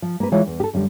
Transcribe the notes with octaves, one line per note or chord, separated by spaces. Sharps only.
F3
A#3 B4
E3 G#3 F4 C#5
E2
G4 A4
F#2 D3 G3